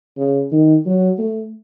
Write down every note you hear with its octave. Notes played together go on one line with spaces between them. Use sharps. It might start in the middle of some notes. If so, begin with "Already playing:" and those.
C#3
D#3
F#3
A3